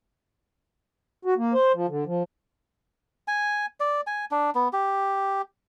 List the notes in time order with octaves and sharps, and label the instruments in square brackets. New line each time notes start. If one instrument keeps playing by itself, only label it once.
[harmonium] F#4
A#3
C5
F3
D3
F3
[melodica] G#5
D5
G#5
D4
B3
G4